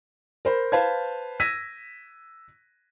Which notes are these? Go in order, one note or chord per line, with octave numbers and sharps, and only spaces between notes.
A#4 C5 B5
B4 C5 F5 A5 B5 G#6
E6 G#6 A#6 B6 D#7